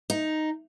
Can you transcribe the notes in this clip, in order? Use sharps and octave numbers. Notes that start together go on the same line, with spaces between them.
D#4